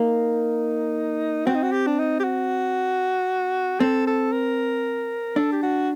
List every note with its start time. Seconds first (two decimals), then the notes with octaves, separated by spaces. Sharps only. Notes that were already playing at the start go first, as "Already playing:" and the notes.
Already playing: A#3 D#4
1.46 C4 F#4
1.55 D#4
1.63 F#4
1.72 G4
1.87 D4
1.99 D#4
2.20 G4
2.24 F#4
3.80 C4 A4
4.07 A4
4.32 A#4
5.36 D4 A4
5.52 G4
5.63 F#4